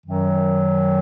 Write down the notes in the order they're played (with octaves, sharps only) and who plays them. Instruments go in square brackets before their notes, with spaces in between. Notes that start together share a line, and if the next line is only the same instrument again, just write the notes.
[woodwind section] F#2 D#3 F#3